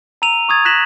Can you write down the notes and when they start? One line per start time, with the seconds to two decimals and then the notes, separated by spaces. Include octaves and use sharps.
0.22 A#5 E6 D#7 F7
0.49 C#6 D#6 G#6 A6
0.65 D#6 F#6 A#6 B6 E7 F#7